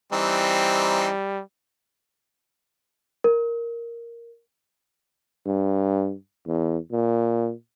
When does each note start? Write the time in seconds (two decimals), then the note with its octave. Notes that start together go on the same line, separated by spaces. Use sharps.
0.13 E3 G3 C4 D#4
3.24 A#4
5.46 G2
6.47 E2
6.92 A#2